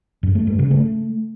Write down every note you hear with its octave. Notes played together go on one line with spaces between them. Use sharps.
F#2
A3
G2
C#3
A3